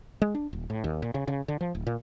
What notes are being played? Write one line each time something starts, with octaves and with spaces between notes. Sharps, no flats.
G#3
D4
D#1
A2
D#2
A#2
C#3
C#3
D3
F3
D1
A#2